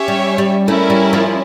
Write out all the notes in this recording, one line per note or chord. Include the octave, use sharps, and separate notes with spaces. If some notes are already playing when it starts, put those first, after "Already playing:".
Already playing: C#4 G4 C#5 E5
G3
G3
A3 C#4 E4 A#4
G3
F3